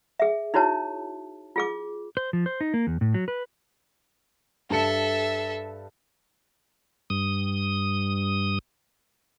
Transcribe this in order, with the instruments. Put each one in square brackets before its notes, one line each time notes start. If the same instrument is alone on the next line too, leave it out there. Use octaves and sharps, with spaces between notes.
[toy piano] G#4 E5
D#4 E4 F#4 C#5 A5
F4 G#4 D6
[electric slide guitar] C5
F3
C5
D#4
A#3
E2
A2
F#3
B4
[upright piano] G2 A5 C#7 [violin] A4 E5
[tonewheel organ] G2 D#6